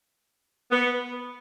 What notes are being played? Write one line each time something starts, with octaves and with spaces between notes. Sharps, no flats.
B3